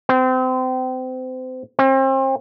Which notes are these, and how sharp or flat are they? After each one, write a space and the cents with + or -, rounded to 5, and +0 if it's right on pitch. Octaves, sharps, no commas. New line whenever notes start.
C4 -30
C4 +35